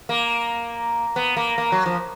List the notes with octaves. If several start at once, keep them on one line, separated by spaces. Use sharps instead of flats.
A#3
B3
A#3
A#3
F#3
F3